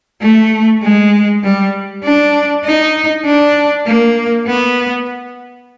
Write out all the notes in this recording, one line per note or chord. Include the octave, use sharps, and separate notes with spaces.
A3
G#3
G3
D4
D#4
D4
A#3
B3